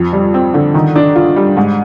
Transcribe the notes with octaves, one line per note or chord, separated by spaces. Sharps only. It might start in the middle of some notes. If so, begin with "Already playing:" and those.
Already playing: F2
G3
C4
D3
D#3
D4
F4
G3
G#2